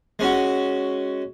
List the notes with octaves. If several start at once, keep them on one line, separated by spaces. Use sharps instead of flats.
G#3 C#4 F#4